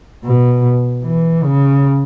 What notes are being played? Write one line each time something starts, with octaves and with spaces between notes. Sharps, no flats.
B2
E3
C#3